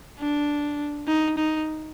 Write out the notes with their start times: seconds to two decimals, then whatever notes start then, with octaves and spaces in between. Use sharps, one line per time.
0.19 D4
1.07 D#4
1.37 D#4